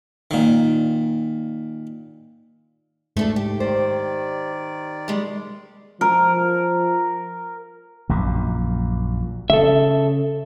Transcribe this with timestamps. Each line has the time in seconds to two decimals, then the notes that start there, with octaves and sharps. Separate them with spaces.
0.31 A#2 D#3
3.17 G#2 A3 D4 A4
3.36 G4
3.60 D#3 C5 D5
5.08 G3 G#3
6.01 F3 A#4
8.09 A#1 F#2 A#2
9.50 C#3 A4 E5